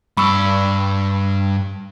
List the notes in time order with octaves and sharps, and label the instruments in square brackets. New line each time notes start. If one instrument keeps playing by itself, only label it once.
[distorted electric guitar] G2 D5 [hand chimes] B5 C#6 E6